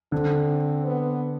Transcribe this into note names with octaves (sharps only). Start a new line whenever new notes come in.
D3 C4
B3